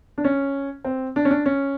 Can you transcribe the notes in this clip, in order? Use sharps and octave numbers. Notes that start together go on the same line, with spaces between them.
D4
C#4
C4
D4
C#4
D4
C#4